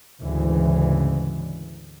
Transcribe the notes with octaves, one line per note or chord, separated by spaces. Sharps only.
D2 G#2 C#3 E3